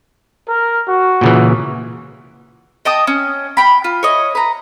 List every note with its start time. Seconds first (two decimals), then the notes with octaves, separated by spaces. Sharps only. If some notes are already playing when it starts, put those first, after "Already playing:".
0.48 A#4
0.88 F#4
1.21 A#2 C#3 E3
2.85 D#5 G5 A5 D#6
3.07 C#4
3.57 G5 B5
3.84 F4
4.03 C#5 D#5
4.35 B4 A#5